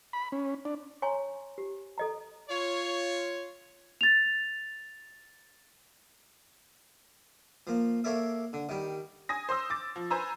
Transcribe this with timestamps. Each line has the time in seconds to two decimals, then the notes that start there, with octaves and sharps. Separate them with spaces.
0.13 B5
0.32 C#4
0.65 D4
1.02 C#5 G#5 A#5 C6 C#6
1.58 G4
1.98 A4 D#5 A#5
2.50 F4 C#5
4.01 A6 F7
7.67 F3 A#3
8.04 A#3 A4 C#5 D5 E5
8.53 D3
8.69 D#3 G3
9.29 G#5 D#6 A#6
9.49 C5 C6 D#6 E6
9.70 D6 A6
9.96 F3
10.11 B4 C5 G#5 A#5 E6